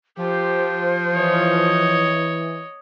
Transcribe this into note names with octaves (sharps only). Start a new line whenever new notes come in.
F3 G4 C5
E3 C#5 D#5